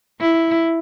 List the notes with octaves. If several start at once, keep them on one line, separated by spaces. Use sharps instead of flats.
E4